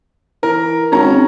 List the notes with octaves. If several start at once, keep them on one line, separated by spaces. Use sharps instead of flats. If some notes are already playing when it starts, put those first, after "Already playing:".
E3 A#4
G#1 C#4 A#5